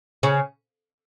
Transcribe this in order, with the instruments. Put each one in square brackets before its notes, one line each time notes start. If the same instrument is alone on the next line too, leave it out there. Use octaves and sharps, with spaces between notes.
[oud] C#3 C#4